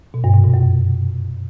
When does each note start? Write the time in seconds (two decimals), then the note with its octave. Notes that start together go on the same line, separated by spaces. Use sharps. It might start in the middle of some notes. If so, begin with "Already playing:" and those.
0.14 B2
0.24 G2
0.34 C3
0.44 B2
0.54 F#2